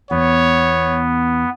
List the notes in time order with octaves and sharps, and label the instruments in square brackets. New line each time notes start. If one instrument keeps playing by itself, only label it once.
[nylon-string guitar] E2 [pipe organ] B3 [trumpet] C#5